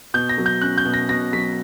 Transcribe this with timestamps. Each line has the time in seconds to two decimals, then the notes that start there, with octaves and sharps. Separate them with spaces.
0.14 B2 G6
0.29 A#6
0.38 F#3
0.46 G6
0.61 C#4 F#6
0.78 G6
0.85 B2
0.94 A#6
1.09 B2 A#6
1.33 F#3 B6